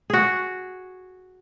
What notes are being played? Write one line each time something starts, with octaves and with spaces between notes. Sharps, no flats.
F#4 G#4